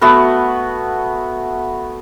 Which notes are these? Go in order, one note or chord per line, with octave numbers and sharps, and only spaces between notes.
A3 B3 F#4 B4